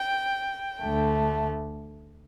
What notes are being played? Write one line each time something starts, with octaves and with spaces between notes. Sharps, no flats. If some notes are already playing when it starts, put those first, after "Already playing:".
Already playing: G5
D2 D3 A3